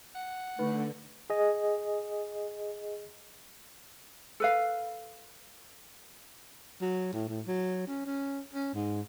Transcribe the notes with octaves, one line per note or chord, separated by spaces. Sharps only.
F#5
D3 A3 D#4 B4 B5
G#4 D#5
A4 B4 F5
F#3
A2
A2
F#3
C#4
C#4
C#4
G#2